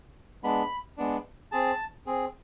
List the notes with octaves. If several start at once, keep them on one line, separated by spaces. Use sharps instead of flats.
G#3 B3 D4 B5
G#3 B3 D4
C4 G#4 A5
C4 G#4